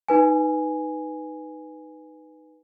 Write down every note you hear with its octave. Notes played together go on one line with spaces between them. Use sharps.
D#4 B4 G#5